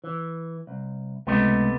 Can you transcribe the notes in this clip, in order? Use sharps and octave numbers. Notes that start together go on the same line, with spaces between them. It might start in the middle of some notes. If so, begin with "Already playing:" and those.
E3
C2
C#2 C3 G#3 A3 B3 D#5